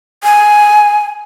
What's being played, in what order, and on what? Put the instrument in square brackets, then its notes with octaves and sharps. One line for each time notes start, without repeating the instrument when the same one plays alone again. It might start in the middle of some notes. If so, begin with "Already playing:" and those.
[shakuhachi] G#5